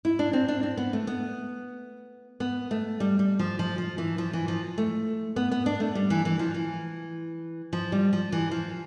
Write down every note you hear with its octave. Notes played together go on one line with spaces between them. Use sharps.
E4
D4
C4
D4
C4
B3
A3
B3
B3
A3
G3
G3
F3
F3
F3
E3
F3
E3
F3
A3
B3
B3
D4
A3
G3
E3
E3
F3
E3
F3
G3
F3
E3
F3